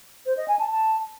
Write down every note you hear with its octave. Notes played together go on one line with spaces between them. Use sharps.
C5
D#5
G#5
A5
A5